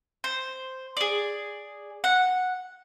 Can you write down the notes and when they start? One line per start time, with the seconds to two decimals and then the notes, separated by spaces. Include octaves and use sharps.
0.24 C5
0.97 G#4 D5
2.04 F#5